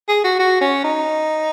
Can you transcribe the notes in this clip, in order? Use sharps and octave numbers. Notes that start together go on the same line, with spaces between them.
G#4
F#4
F#4
C#4
D#4